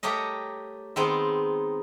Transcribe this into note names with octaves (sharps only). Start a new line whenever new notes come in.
A3 G4 A#4 C#5 D#5
D#3 G#3 B3 C4 D#4